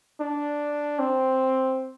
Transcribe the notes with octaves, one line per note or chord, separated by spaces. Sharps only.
D4
C4